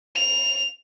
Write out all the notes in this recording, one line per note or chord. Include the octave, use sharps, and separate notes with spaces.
F7